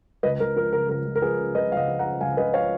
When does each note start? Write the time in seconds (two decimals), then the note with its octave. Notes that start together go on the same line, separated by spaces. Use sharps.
0.23 C#2 B4 D#5
0.40 C#2 A#4
0.56 F3 A#4
0.73 C#3 A#4
0.89 C#2 A#4
1.06 C#2
1.16 A#4
1.22 F3 G#4 B4
1.38 C#3
1.55 C#2 B4 D#5
1.72 C#2 D#5 F5 F#5
1.88 F3
1.99 F#5 A#5
2.05 C#3
2.21 C#2 F5 G#5
2.37 C#2 B4 D#5
2.54 F3 C#5 F5